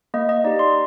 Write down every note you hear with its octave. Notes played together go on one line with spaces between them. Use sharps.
A#3 D#5
D#5
D#4 G4 D5
C6